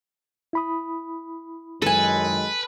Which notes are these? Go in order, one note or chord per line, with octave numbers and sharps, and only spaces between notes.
E4 B5 D#6
F#2 D#3 G#3 A4 B4 G#5